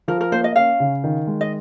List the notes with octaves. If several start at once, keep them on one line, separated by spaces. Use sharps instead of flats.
F3 A#4
A#4
A#3 C5
D#5
C#4 F5
C#3
D#3
G#3
D#5